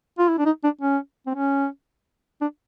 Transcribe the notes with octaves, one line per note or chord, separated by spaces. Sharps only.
F4
E4
D4
D#4
D4
C#4
C4
C#4
D4